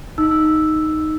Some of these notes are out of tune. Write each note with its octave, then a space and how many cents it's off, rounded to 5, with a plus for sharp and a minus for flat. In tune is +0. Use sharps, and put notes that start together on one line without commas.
D#4 +0 E6 +0